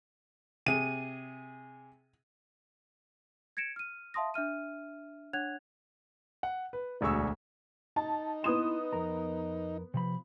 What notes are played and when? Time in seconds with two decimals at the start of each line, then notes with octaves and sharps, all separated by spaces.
0.66 C3 G#4 D#7
3.57 G#6 A#6 C#7 D7 E7
3.76 F6 D#7
4.14 E5 F5 A5 C6 D#6 A#6
4.34 D4 E5 F6 D#7
5.33 D4 C#5 F#5 F#6 G#6 F7
6.43 F#5
6.73 B4
7.01 E1 D2 G#4 C#6 E6
7.96 D#4 A5
8.44 B3 E4 C6 D#6 E7
8.93 F2 A#4 A#5
9.94 C3 F3 B5